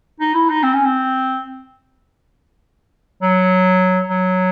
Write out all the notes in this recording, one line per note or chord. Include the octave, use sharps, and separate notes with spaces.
D#4
E4
D#4
C4
C#4
C4
F#3
F#3